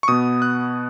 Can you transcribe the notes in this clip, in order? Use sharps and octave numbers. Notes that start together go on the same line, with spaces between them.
C#6
B2 B3 D#6
F#6